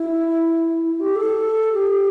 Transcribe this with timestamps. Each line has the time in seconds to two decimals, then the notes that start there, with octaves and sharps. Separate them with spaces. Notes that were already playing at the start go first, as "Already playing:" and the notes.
Already playing: E4
0.84 E4
1.00 G4
1.15 A4
1.73 G4